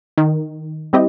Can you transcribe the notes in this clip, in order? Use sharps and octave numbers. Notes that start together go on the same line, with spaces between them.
D#3
G3 C4 E4 G4 D#5